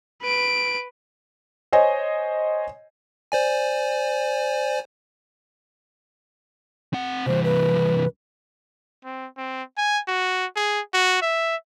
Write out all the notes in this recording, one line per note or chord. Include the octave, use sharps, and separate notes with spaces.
B4 D7
C5 C#5 D#5 G#5
C5 D5 G#5
C4 F#5
C2 E3 C5
B4
C4
C4
G#5
F#4
G#4
F#4
E5